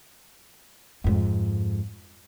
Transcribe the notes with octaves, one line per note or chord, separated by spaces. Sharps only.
F2 G#2